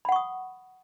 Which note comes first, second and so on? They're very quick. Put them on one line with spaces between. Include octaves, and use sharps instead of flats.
B5 F#5 C#6 D#6